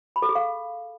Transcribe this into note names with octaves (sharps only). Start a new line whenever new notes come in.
B5
A4
G#4
F5